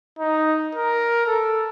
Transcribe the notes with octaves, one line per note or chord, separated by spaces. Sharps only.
D#4
A#4
A4